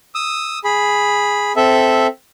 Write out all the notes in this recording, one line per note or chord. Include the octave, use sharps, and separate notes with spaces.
D#6 E6
G#4 B5
C4 A4 E5